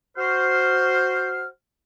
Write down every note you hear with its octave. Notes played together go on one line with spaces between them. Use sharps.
F#4 C5 F6